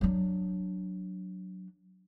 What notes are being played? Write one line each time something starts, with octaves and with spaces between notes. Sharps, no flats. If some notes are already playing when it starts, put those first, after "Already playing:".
F#3 D4